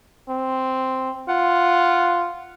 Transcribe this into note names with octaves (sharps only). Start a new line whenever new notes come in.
C4
F4 F#5